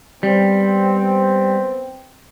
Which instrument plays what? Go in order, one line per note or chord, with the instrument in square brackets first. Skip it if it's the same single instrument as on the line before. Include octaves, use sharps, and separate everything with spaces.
[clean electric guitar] G3 [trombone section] B3 C4